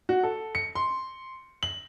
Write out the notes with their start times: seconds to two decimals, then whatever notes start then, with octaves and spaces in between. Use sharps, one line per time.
0.09 F#4
0.23 A4
0.55 C#7
0.75 C6
1.63 F#7